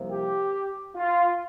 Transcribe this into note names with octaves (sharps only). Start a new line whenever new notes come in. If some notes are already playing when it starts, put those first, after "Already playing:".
Already playing: C2 C3 F3 A#3
G4
F4